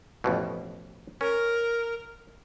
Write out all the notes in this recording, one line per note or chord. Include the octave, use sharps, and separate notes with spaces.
A1 F2 B2
C#4 A#4